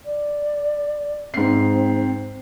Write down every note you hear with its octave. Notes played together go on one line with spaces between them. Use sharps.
D5
G#2 C4 C7